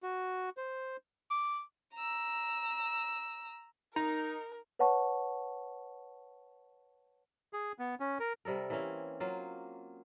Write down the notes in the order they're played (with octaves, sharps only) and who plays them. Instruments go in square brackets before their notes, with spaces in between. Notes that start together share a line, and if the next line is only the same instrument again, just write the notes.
[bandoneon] F#4
C5
[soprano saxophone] D6
[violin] A#5 E6
[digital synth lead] D#4 [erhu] A#4 [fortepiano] A#5
[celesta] B4 C#5 F#5 A5 C#6
[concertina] G#4
B3
C#4
A#4
[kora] C3 G3 A4 A#4
E3 A#3 C4 C#4
F#3 A#3 F4